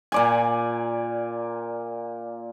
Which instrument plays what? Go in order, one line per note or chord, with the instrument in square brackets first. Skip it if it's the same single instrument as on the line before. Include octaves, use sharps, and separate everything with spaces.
[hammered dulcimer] A#2 D5 G#5